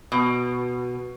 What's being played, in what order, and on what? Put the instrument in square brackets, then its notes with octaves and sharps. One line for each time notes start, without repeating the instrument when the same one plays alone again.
[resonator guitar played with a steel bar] B2